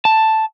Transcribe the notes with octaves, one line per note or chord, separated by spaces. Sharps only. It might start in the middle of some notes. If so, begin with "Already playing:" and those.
A5